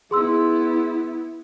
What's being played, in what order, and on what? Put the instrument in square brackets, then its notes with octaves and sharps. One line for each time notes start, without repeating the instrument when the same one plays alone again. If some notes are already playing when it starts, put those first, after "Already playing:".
[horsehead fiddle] B3 E4 [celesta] G#4 C6 E6